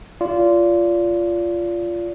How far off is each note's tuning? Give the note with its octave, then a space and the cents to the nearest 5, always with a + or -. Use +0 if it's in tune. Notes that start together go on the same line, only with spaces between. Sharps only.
F4 -15 D5 -30